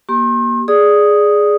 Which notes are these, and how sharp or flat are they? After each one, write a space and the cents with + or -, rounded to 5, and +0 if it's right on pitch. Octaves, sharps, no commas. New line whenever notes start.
A#3 +25 G4 -20 C6 +45
G#4 +0 D5 +0 D#6 +0